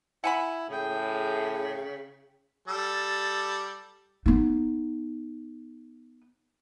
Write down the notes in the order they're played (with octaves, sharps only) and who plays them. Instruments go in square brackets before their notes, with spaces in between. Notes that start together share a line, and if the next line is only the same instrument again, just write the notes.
[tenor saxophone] E4 [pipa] F#5 G#5 B5
[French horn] A2 [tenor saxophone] C#3 [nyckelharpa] G#4 G5
[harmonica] G3 A4
[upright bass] B3 D#4